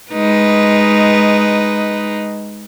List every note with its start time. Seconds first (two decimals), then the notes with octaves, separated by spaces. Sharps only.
0.12 G#3 D#4 B4